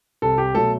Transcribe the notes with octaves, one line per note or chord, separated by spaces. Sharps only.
C2 A4
G4
B2 F#3 A3 A4